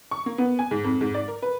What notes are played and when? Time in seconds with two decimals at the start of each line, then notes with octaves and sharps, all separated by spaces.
0.11 C#6
0.26 A#3
0.38 B3
0.59 G#5
0.71 G#2
0.84 F2
1.01 G#2
1.14 D5
1.28 A#4
1.42 B4